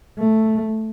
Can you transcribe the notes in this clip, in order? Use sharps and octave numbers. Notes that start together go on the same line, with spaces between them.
A3